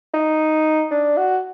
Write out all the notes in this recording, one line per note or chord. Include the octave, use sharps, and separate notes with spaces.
D#4
D4
F#4